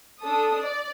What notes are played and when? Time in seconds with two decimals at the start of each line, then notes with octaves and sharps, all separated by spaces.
0.21 D4 A4 D#6
0.62 D5